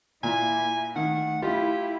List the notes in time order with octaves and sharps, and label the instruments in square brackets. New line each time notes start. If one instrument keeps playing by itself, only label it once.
[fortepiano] A#2 [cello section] A#3 E4 [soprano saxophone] G#5
[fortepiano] D#3 [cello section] A3 [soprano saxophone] F#5
[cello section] E4 [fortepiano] F4 [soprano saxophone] G4